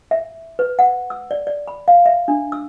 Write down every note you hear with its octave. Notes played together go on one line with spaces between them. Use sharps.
E5
B4
F#5
E6
D5
D5
B5
F5
E5
D4
E6